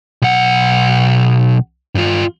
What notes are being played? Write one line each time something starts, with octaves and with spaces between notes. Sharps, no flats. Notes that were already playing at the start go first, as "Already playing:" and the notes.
B1 F#5
G2 F4